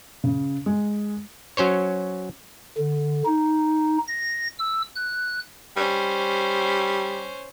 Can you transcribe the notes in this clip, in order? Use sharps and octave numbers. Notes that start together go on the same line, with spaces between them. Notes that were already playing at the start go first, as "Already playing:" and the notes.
C#3
G#3
F#3 C#4 C5 C#5
D3
D#4
A#6
E6
F#6
G3 C#4 C5